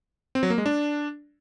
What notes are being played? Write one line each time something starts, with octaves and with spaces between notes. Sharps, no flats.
C4
F#3
A#3
G#3
D4